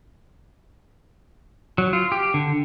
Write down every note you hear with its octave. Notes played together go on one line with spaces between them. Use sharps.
F#3
F4
G4
D3